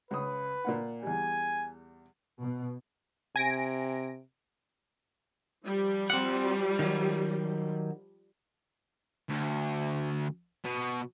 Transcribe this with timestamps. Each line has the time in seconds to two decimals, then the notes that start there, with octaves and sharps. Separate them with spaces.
0.11 C#2 B4 D#6
0.65 A#2 A#3 F#5
1.03 E2 G3 G#5
2.41 B2
3.36 C3 G#5 A#6 D7
5.65 F3 G3
6.10 C4 F#5
6.79 D#3 F#3
9.29 D2
10.65 B2